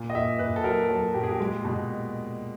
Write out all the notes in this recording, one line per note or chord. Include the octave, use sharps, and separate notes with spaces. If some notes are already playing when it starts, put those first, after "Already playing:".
Already playing: A#2
D#5
A#2 E5
A#2 B4
A4
F#3 A#4
F#3 A4
A#2 G4
G#4
G4
G#3
B2